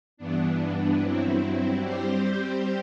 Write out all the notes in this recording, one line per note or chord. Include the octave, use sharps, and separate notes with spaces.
G2 E3 B3 D4
G2 F#3 C4 E4
G3 C4 G4 C5